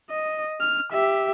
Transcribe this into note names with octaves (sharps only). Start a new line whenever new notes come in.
D#5
F6
G4 E5